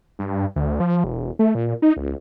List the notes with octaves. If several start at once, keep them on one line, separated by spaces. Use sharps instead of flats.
G2
D2
F3
E1
A3
A#2
D#4
C#2